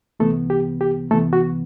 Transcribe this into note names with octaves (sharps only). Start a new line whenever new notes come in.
C2 C3 E3 A3 B3 A4
G4
G4
C2 C3 E3 A3 B3 A4
F#4